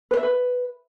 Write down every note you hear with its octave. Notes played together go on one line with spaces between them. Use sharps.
B4
E5
B4